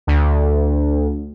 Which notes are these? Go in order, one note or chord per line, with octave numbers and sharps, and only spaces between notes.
D2